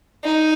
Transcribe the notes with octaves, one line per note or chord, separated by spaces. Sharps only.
D#4